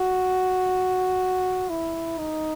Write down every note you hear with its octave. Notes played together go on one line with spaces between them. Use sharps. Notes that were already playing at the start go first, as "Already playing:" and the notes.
Already playing: F#4
E4
D#4